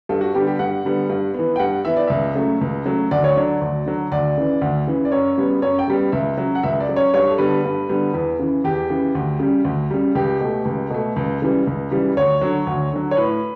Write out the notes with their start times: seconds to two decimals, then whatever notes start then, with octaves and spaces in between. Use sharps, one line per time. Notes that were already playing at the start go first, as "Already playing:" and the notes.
0.09 G2 A4
0.21 F#4
0.34 D3 G3 B3 G4
0.47 G4
0.59 G2 F#5
0.85 D3 G3 B3
1.10 G2
1.34 E3 B3
1.56 G5
1.59 G2 F#5
1.85 E3 B3 E5
1.97 D5
2.07 C#2 E5
2.35 C#3 F#3 A3
2.61 C#2
2.85 C#3 F#3 A3
3.11 D2 D5
3.24 C#5
3.36 D3 F#3 D5
3.61 D2
3.86 D3 F#3
4.12 D2 D5
4.37 C#3 E3
4.61 D2
4.87 C#3 E3
5.05 D5
5.12 F#2 C#5
5.37 C#3 G3 B3
5.62 F#2 C#5
5.79 G5
5.88 C#3 G3 B3
6.12 C#2 E5
6.37 C#3 F#3
6.55 F#5
6.63 C#2 E5
6.80 D5
6.89 C#3 F#3
6.96 C#5
7.14 G2 C#5
7.30 A4
7.38 D3 G3 B3 B4
7.64 G2
7.89 D3 G3 B3
8.14 E2
8.39 C#3 E3
8.64 E2 G4
8.90 C#3 E3
9.15 D2
9.39 C#3 G3
9.65 D2
9.91 C#3 G3
10.15 C#2 G4
10.40 B2 A3
10.65 C#2
10.90 B2 A3
11.16 C#2
11.42 C#3 E3 G3
11.67 C#2
11.91 C#3 E3 G3
12.17 D2 C#5
12.41 D3 F#3
12.67 D2
12.93 D3 F#3
13.11 C#5
13.17 A2 B4